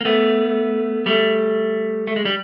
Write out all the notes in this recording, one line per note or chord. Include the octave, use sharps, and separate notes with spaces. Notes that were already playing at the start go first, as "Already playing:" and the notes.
A#3
A3 B3
G3 A3
A3
G#3
G3